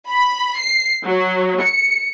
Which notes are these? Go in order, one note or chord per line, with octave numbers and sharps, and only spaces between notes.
B5
C7
F#3
C#7